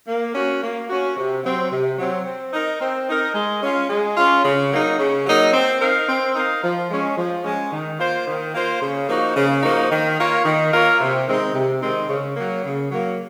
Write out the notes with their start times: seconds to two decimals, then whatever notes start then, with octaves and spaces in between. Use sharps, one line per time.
0.08 A#3
0.35 C#4 F#4
0.62 A#3
0.89 C#4 F#4
1.17 C3
1.44 F#3 C4
1.72 C3
1.98 F#3 C4
2.25 C4
2.53 D#4 A#4
2.81 C4
3.08 D#4 A#4
3.35 G#3
3.63 C#4 F4
3.90 G#3
4.17 C#4 F4
4.45 C#3
4.71 F#3 A#3 D#4
4.99 C#3
5.26 F#3 A#3 D#4
5.53 C4
5.81 D#4 A#4 F5
6.09 C4
6.35 D#4 A#4 F5
6.64 F3
6.90 G#3 C#4
7.18 F3
7.44 G#3 C#4
7.73 D#3
7.99 A#3 F4 C5
8.27 D#3
8.54 A#3 F4 C5
8.82 C#3
9.09 F3 A#3 D#4 F#4
9.36 C#3
9.63 F3 A#3 D#4 F#4
9.91 D#3
10.18 A#3 F4 A#4 C#5
10.45 D#3
10.73 A#3 F4 A#4 C#5
11.01 C3
11.27 D#3 G#3 C4 D#4
11.54 C3
11.81 D#3 G#3 C4 D#4
12.09 C#3
12.36 F#3 A#3
12.64 C#3
12.91 F#3 A#3